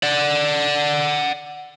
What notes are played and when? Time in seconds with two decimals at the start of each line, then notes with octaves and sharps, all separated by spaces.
0.03 D5 F#5